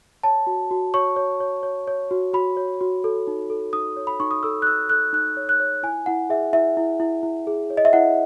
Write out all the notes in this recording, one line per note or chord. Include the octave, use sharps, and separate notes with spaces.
C#5 A5
F#4
F#4
C#5 C#6
C#5
C#5
C#5
C#5
F#4
F#4 B5
C#5
F#4
A4
D#4
A4
D#4 D#6
C#5
B5
D#4 C#6
D#6
A4 E6
F#6
D#4 E6
A4 F#6
D#4 F#6
C#5
F#6
C#5
E4 G#5
E4 F#5
G#4 E5
E4 E5
E4
E4
E4
G#4
C#5
D#5
E5
E4 F#5